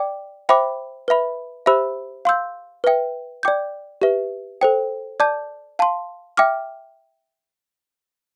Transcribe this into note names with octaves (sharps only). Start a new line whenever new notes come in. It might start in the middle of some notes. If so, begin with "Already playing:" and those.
Already playing: D5 G5 D6
C5 E5 G5 B5 D6
B4 E5 B5
G4 C5 E5 B5 E6
F5 C6 E6 G6
B4 E5 G5
D5 G5 D6 G6
G4 B4 E5
A4 C5 G5
D5 A5 D6 G6
F5 A5 C6
E5 G5 D6 F6